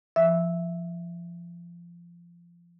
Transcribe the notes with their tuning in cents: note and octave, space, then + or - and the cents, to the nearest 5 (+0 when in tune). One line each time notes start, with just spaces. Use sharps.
F3 -20 E5 +0 E6 -5